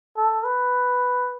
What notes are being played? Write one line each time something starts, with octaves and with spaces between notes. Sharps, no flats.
A4
B4